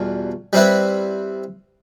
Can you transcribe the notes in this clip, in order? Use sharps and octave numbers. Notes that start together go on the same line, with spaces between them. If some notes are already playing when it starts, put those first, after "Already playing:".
Already playing: E2 B2 G3 F4
G3 C4 E4 B4